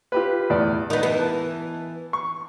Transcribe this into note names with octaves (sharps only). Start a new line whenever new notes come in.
F4 G4 B4
E2 A2 D5
D#3 B3 D#4
E3 B3
A5
C#6